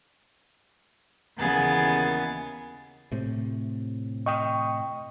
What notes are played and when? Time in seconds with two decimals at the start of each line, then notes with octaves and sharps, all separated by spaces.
1.37 D#2 C#3 E3 B3 G#4 A6
3.12 A2 C3
4.26 D#5 G5 C#6 D#6